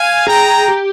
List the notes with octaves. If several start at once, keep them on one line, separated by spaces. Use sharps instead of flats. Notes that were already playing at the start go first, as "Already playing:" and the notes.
Already playing: F5 G#5
G#4 G5 A#5
G4